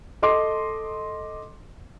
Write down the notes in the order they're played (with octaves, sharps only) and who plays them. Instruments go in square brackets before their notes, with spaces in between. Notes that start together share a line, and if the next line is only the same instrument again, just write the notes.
[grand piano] A4 D#5 C6 D6